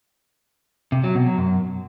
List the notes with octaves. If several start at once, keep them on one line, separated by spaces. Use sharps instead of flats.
C3
F#3
B2
F#3
F#2